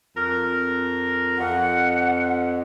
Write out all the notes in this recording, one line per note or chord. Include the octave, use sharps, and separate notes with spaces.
F2 A#4
F2 F#5